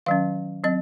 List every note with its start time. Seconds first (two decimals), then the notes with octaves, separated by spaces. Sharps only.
0.06 D#3 F#3 C#4 F5
0.64 F#3 C4 D#5